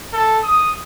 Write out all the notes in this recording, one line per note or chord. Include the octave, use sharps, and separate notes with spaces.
A4
D#6